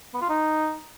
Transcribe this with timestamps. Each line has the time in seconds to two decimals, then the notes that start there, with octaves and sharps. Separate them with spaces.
0.14 B3
0.22 F4
0.29 D#4